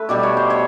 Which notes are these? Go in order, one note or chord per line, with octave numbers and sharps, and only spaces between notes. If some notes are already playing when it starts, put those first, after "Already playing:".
Already playing: A3 B4
B2 G3 D5
C#5
C5
C#5